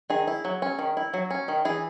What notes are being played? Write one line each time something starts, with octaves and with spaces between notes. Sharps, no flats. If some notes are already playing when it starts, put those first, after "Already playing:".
D#3 G#4
E4
F#3
C#4
D#3
E4
F#3
C#4
D#3
E3 G#4